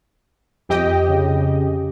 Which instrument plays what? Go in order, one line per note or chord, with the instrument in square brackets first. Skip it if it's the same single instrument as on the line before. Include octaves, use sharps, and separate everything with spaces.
[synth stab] F2 G4 D#5 [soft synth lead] G5
[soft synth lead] C#3